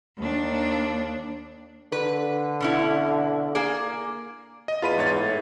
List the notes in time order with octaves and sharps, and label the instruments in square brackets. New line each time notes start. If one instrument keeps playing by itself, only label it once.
[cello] D#2 D4
[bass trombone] D3 [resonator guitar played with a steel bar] B4
[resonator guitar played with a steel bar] B2 C#4 E4
A#3 G#4 D5
[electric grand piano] D#5
[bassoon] E2 [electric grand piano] F4 B5 D#7
[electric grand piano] G#2 C#5 A6
[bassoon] A2